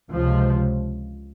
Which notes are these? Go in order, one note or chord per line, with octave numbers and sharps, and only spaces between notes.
C#2 C3 F3